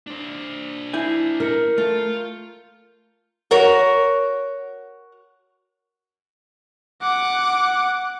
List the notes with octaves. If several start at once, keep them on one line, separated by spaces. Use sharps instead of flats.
D4 C5
E4 G#5 G6 C7
A#4 F6 C#7
A3 F4
F#4 A#4 C#5
F#5 D6